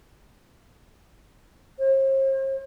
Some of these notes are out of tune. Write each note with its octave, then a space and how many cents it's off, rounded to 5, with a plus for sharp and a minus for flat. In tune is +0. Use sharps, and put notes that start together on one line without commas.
C5 +45